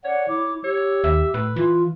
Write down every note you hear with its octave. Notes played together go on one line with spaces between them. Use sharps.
C#5 D5 F#5
E4 D6
G4 C#5 E6
D#2 E5
A2 B4
E3 F4